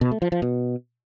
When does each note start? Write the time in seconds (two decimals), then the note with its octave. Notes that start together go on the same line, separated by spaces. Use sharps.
0.01 B2
0.12 A3
0.22 F3
0.32 F3
0.42 B2